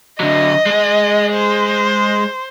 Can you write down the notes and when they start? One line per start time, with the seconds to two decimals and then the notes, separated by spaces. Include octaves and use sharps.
0.20 D3 F#3 D#5
0.66 G#3 G#4
1.33 C5